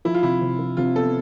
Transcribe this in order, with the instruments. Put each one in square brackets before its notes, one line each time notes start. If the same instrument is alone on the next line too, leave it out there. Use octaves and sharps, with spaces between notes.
[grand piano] F3 [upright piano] E4
[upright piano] F4
[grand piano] C3 [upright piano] E4
[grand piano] C3
F3
[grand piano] C3 [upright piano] F4
[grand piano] B3 [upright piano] A4